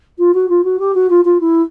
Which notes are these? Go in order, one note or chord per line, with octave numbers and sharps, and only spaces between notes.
F4
F#4
F4
F#4
G4
F#4
F4
F4
E4